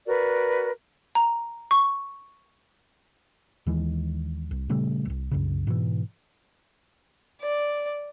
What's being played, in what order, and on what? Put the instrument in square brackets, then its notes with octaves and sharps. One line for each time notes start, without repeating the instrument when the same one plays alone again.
[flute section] F#4 A#4 B4 D5
[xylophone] A#5
C#6
[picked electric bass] D#2 D#3 E3 G#3
C2
A#2 C#3 G3 A3
D1 C2
C2 F#2 C#3
G#2 B2 D#3 E3
[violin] D5